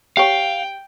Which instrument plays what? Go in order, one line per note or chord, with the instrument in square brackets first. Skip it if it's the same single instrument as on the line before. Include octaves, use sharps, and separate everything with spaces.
[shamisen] G4 C#5 [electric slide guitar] F5 [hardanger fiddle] G5